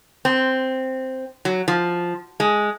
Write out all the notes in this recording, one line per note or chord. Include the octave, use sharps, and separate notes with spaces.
C4
F#3
F3
G#3